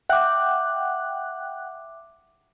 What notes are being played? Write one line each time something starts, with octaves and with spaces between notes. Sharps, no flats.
E5 F#5 G5 D6 F#6